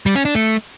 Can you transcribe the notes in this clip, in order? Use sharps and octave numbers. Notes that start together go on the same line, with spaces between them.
G3
C#4
D4
A3